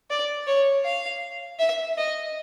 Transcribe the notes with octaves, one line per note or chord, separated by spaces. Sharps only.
D5
C#5
F5
E5
D#5